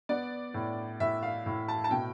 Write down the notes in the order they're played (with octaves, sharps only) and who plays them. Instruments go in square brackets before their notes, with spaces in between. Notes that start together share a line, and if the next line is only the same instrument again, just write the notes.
[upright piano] B3 D5
A2
A2 E5
F5
A2
A5
A5
B2 G5